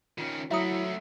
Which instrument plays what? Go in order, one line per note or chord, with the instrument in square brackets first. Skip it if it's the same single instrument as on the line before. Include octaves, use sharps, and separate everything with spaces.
[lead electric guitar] D#3 C#4 [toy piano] F4
[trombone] F#3 [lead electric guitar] A3 F#4 [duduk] E4 [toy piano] E5 A#5 D#6